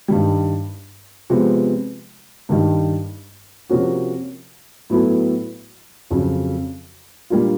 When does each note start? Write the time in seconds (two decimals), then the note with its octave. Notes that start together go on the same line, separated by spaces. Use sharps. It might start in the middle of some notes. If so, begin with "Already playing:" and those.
0.08 G2 D#3 G3
1.30 C3 F3 G#3 B3
2.49 G2 D#3 G3
3.70 C3 F3 A#3 C#4 F#4
4.90 A2 F#3 B3 E4 A4
6.11 F2 C#3 F#3
7.30 A#2 G3 A#3 D4 F4